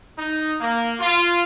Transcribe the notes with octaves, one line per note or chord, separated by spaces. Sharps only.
D#4
A#3
F4